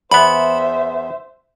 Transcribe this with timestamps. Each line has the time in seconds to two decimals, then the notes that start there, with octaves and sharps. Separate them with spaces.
0.11 E2 B3 C5 E5 B5